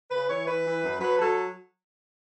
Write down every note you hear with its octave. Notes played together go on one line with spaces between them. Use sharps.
C#3 B4
E3 C#5
E3 B4
E3
F#2
F#3 B4
F#3 A4